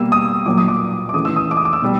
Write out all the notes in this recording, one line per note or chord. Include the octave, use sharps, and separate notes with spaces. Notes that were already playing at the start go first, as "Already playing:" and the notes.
Already playing: B2 G3 A#3 E6
D#6
A#2 F#3 A#3 D6
D#6
D6
D6
C#3 E3 A3 D#6
E6
D#6
D6
D#6
D6
E6
B2 G3